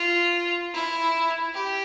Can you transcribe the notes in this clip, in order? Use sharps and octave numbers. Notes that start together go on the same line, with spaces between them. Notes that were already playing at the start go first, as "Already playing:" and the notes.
Already playing: F4
E4
G4